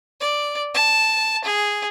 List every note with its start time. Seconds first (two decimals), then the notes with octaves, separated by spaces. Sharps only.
0.20 D5
0.74 A5
1.44 G#4